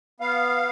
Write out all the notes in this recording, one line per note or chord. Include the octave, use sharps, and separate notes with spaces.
B3 F5